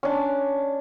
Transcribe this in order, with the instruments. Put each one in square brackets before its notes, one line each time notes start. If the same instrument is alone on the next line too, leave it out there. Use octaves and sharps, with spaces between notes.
[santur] C#4 D4